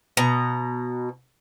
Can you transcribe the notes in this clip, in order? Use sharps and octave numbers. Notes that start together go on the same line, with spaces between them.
B2 A#5